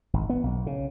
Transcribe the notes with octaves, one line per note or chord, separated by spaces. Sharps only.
G#1
B3
B1
C#3